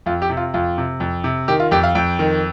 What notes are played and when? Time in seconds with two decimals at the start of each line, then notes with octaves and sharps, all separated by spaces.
0.06 F2 F4
0.22 G4
0.30 C3
0.37 F4
0.54 F2 F4
0.78 C3
1.00 F2
1.24 C3
1.48 D#3 G4
1.60 F4
1.71 F2 G4
1.83 F5
1.95 F2 G5
2.19 D#3